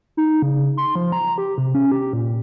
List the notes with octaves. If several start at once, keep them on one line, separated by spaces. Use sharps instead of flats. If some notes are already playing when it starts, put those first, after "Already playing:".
D#4
C#3
C6
F3
A#5
G4
C3
C#4
G4
A#2